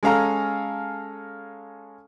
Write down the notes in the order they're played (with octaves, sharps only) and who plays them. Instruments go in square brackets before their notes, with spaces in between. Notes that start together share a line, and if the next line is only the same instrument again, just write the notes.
[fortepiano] G#3 C#4 A4 F5 A#5